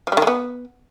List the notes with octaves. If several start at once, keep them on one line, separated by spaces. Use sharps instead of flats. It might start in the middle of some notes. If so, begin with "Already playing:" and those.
F3
G3
D#3
G#3
B3